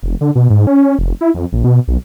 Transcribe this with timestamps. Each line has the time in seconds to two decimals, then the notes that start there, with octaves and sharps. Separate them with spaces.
0.03 F1
0.21 D3
0.35 B2
0.50 G#2
0.67 C#4
0.99 F1
1.21 E4
1.35 F2
1.52 A#1
1.64 B2
1.88 B1